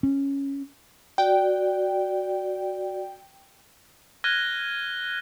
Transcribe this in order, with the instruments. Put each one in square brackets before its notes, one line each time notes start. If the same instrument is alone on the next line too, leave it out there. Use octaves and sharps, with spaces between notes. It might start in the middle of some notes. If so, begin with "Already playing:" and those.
[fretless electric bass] C#4
[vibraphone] F#4 D5 [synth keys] G5
[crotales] F6 F#6 G#6 A#6 D#7 G7